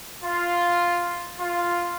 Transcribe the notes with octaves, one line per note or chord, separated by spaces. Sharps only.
F4
F4